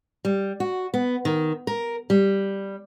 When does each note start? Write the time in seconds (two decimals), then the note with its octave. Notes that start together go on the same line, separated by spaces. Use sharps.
0.25 G3
0.60 F#4
0.94 B3
1.25 D#3
1.67 A#4
2.10 G3